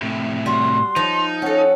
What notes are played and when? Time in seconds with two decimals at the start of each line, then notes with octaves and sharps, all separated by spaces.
0.02 A2 C3
0.46 G3 F#4 C6
0.96 F3 D#4
1.42 C#4 A4 F#5